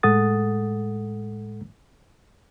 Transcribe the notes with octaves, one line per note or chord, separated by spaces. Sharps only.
A2 G#3 A4 F#5 D#6 A6